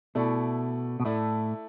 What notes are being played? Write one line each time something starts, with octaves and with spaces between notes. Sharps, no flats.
B2 A3 E4 A4 D5
B2
A2 A3 E4 A4 D5